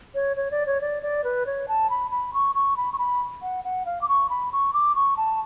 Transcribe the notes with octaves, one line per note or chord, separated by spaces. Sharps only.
C#5
C#5
D5
C#5
D5
D5
B4
C#5
A5
B5
B5
C#6
C#6
B5
C#6
B5
F#5
F#5
F5
D6
C#6
B5
C#6
D6
C#6
A5